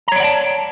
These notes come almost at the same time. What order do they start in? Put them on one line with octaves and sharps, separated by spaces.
A#5 C#5 D5 F#5 A5